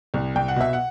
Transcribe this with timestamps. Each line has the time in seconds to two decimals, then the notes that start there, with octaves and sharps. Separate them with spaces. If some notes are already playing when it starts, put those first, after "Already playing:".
0.14 C2
0.35 C2 G5
0.48 F#5
0.56 B2 E5
0.73 F#5